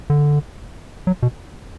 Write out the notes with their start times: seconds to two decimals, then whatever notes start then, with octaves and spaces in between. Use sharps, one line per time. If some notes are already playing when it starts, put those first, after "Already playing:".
0.10 D3
1.07 F#3
1.23 B2